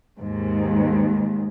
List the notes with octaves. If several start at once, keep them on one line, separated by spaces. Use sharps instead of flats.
D#2 G#2